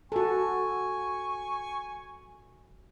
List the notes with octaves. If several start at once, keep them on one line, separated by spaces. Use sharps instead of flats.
F#4 A4 G#5 C#6